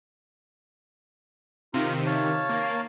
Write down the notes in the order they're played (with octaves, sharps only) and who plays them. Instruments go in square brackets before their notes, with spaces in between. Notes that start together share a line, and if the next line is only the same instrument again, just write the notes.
[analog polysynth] C3 D#3 [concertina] F4 A#5
[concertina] C#5 F5 A5
[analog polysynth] A#3